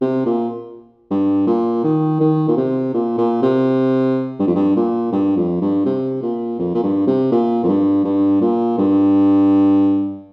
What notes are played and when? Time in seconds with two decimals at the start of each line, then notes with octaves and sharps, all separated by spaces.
0.01 C3
0.26 A#2
1.11 G2
1.47 A#2
1.84 D#3
2.20 D#3
2.48 A#2
2.57 C3
2.94 A#2
3.18 A#2
3.42 C3
4.39 G2
4.47 F2
4.55 G2
4.76 A#2
5.12 G2
5.37 F2
5.61 G2
5.86 C3
6.22 A#2
6.59 F2
6.75 A#2
6.83 G2
7.07 C3
7.32 A#2
7.64 F2
7.68 G2
8.05 G2
8.41 A#2
8.78 G2